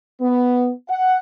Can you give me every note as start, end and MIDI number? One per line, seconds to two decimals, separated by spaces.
0.21 0.70 59
0.89 1.18 78